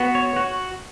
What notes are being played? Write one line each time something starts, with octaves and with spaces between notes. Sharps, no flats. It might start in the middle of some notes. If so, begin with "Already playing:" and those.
Already playing: B3 F#4
C#5
F#4